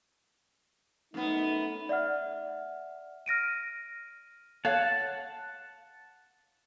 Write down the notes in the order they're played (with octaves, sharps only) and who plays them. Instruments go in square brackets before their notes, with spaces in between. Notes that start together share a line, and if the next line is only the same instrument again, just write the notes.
[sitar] F#2 B3 [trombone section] A3 D#4
[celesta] D5 E5 F#5 F6
F6 A#6 D7 D#7
[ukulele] C#5 F5 [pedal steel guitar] F#5 A5